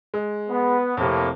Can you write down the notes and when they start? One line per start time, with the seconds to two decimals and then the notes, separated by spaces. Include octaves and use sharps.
0.14 G#3
0.49 B3
0.97 F2 A2 C3 A#3